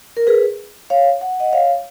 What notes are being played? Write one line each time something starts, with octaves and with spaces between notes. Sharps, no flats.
A#4
G#4 B4
C#5 F5
F#5
D#5 F#5
C#5 F5